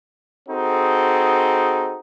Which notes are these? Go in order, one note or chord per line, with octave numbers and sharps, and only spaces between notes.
C4 D#4 F#4 G#4 A4